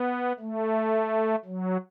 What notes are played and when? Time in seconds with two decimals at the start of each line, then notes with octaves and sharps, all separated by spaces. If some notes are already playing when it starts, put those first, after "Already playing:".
Already playing: B3
0.40 A3
1.45 F#3